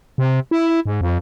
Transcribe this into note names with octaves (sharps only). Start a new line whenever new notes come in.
C3
E4
G#2
F2